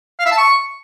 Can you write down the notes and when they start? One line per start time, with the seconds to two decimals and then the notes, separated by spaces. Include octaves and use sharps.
0.19 F5
0.25 E5
0.32 A5
0.38 C#6